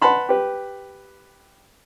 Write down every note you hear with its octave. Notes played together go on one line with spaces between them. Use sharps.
B4 F#5 A5 B5 C6
G4 B4